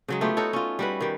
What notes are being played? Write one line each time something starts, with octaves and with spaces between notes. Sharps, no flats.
C#3 F#3 G#3
A3 B3 F4 G4
D#4 F#4 A4 C#5
C#4 F4
G3 F#4 B4
D#3 G3